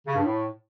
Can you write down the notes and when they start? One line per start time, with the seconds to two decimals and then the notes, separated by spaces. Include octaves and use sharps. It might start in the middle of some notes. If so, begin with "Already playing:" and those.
0.07 C#3
0.15 G2
0.24 A2